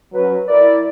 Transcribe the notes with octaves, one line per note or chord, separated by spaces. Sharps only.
F#3 C#4 B4
E4 A#4 D5